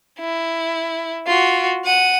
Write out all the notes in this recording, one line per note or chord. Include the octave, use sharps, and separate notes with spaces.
E4
F4 F#4
F#5 D#7